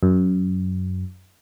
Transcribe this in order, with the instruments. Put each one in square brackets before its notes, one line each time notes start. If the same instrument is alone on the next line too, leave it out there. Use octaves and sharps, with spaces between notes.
[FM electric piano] F#2